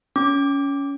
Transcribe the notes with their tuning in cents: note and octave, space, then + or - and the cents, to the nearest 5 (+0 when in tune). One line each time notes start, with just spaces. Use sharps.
C#4 +15 D6 +0